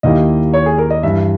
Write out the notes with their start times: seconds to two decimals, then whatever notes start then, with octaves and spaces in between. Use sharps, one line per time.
0.03 D#2 D#3 A#3 E4 G4 D#5
0.53 C#5
0.66 G#4
0.78 A#4
0.90 D#5
1.03 G2 E3 G3 E5